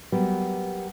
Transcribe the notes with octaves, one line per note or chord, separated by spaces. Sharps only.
F#3 G3 A#3 B3